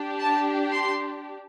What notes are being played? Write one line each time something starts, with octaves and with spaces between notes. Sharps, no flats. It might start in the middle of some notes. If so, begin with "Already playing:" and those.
Already playing: D4 G4
A5
C6